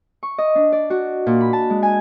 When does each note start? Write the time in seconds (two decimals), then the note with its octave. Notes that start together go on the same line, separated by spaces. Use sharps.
0.23 C#6
0.38 D#5
0.55 D4
0.72 D5
0.90 F#4
1.26 A#2
1.41 B5
1.53 A5
1.70 G#3
1.83 G#5